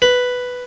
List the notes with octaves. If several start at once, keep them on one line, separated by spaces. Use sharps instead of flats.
B4